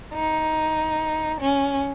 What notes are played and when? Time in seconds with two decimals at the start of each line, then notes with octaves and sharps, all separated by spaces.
0.14 D#4
1.41 C#4